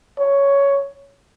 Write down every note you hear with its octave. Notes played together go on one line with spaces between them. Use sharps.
C#5